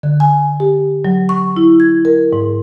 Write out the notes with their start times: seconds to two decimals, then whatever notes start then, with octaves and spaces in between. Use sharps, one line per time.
0.03 D3
0.20 G#5
0.60 G4
1.05 F#3
1.29 C#6
1.57 E4
1.80 G#6
2.05 A#4
2.33 G#2